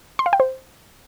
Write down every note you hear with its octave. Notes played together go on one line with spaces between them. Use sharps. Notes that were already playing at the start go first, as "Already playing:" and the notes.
C6
F5
G5
C5